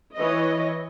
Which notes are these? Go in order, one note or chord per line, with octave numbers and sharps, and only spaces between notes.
E3 C#5 D#5